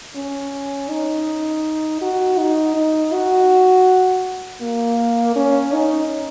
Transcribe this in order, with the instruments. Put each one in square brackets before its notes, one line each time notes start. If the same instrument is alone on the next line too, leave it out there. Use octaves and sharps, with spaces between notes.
[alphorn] C#4
D#4
F#4
D#4
D#4
F#4
A#3
C#4
D#4